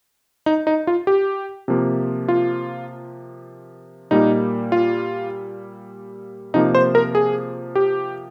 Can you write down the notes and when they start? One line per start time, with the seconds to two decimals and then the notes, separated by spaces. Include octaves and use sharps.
0.46 D#4
0.67 D#4
0.87 F4
1.07 G4
1.68 C3 F3 A#3
2.28 F4
4.11 A#2 G3 A#3 D#4
4.72 F4
6.54 C3 F3 A#3 D#4
6.75 C5
6.95 A#4
7.15 G#4
7.75 G4